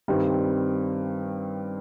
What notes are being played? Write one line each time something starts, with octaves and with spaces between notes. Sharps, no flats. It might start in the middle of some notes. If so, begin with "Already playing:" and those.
G2 D#3 G3 C4